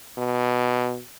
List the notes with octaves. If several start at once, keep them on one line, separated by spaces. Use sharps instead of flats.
B2